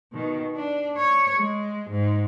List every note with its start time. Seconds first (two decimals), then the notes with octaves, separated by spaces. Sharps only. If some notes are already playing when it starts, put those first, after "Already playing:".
0.13 B2 D#3
0.55 D4
0.97 C#5
1.34 G#3
1.90 G#2